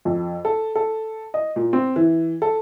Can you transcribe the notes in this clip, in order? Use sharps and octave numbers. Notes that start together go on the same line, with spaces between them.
F2
A4
A4
D#5
A#2
C4
E3
A4